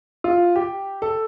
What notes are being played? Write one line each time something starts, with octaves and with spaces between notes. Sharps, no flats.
F4
G4
A4